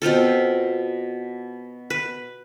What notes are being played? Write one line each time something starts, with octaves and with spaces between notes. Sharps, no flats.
B2 C4 F4 A4
B4